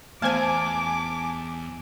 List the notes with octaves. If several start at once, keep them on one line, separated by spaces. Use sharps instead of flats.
E2 A3 B3 C5 G#5 A5 D6